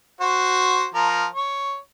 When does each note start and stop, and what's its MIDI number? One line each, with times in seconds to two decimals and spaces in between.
0.21 0.86 66
0.21 0.86 72
0.94 1.25 53
0.94 1.25 70
1.33 1.78 73